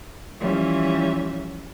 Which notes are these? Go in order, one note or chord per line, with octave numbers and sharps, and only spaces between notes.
E3 F3 G3 C#4 E5